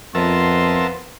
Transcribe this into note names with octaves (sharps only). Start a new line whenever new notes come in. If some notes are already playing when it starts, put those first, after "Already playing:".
F2 F3 B3 A#4 E5 A5 C6